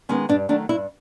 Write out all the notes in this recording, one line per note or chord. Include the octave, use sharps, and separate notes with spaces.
D#3 G#3 B3 C#4
G2 D4
D#3 F#3 A3 D4
G2 E4